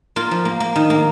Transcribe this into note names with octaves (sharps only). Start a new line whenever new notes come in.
A#3 F4
F3
A#3
A#3
D#3
A#3